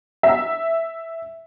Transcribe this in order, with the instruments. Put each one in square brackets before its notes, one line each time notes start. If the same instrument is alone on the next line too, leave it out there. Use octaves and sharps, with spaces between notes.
[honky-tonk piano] E5